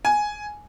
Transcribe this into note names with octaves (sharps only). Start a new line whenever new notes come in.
G#5